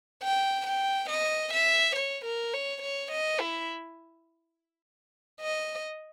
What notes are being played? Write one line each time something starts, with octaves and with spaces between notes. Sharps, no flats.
G5
G5
D#5
E5
C#5
A#4
C#5
C#5
D#5
E4
D#5